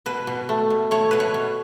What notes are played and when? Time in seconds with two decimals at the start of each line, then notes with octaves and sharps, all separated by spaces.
0.06 B2 B4
0.27 B2
0.49 A3
0.70 B2
0.91 A3 C#5
1.11 B2 B4
1.20 C#5
1.34 B2